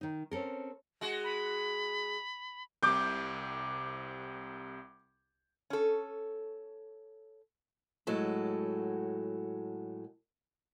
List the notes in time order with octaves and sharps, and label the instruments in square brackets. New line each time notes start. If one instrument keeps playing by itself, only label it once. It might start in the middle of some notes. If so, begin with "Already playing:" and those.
[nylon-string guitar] D#3 D#4
C4 C#4 A4 A#4
[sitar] G#3 F#4
[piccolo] B5
[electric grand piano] C2 C3 [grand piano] D6 G6
[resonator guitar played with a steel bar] C#4 A4
[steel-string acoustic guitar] A2 F#3 G#3 A4